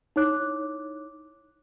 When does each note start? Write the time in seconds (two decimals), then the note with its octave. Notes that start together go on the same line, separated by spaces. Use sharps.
0.16 D#4 E4 C#5 D6 F#6